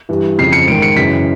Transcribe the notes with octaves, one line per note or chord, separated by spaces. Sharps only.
G2 E3
F2 C#3 F3 C7
C#7
G#2 D#3 D7
C#7
F#2 C#3 E3 B6